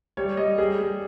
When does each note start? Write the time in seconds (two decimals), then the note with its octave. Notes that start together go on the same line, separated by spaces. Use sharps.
0.17 G3 C#5
0.37 G3 D#5
0.58 G3 G#4
0.80 G3